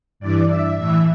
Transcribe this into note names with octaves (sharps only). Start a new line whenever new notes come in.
G2 E3 D5
E5
A2 E3 E5